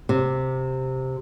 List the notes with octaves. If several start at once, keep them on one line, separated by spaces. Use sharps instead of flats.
C3